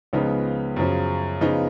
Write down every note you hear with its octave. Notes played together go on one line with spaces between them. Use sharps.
C#2 C#3 F3 B3 D#4
F#2 C#3 F3
C#3 F3 B3 D#4